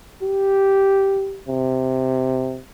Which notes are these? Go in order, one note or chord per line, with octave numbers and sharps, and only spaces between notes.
G4
C3